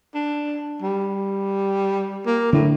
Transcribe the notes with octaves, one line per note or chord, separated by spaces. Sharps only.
D4
G3
A#3
A2 D3 D4